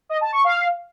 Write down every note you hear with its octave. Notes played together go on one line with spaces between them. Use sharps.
D#5
A5
C#6
F5